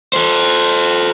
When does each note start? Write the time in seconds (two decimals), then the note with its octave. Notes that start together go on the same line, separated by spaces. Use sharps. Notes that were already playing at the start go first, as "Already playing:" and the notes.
0.13 A4 C5